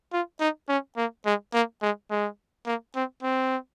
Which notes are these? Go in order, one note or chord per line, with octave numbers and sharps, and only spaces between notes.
F4
D#4
C#4
A#3
G#3
A#3
G#3
G#3
A#3
C4
C4